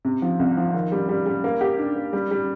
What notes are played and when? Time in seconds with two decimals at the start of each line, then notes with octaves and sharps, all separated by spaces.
0.05 C3
0.22 F3
0.40 C2
0.57 F3
0.74 D#3
0.92 G3
1.09 G3
1.26 G3
1.44 A#3
1.61 G4
1.79 D4
1.96 A#3
2.13 G3
2.31 G3